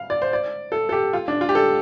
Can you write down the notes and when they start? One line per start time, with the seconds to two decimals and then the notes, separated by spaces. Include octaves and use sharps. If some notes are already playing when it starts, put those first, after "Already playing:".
Already playing: F5
0.10 D5
0.22 C5
0.33 D5
0.72 A4
0.89 A4
0.92 G4
1.13 F4
1.28 D4
1.41 F4
1.49 G4
1.55 A4